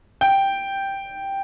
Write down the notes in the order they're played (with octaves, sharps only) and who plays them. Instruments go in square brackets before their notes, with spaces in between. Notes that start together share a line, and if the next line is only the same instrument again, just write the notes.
[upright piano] G5